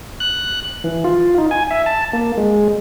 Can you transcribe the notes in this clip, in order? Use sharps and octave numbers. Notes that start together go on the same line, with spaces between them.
F#6
E3
F4
D#4
G#5
E5
A5
A#3
G#3